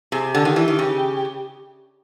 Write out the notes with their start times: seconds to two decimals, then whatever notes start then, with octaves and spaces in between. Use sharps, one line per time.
0.12 C3 G#4
0.35 D3 G4
0.45 D#3
0.56 E3
0.68 D#3
0.79 C#3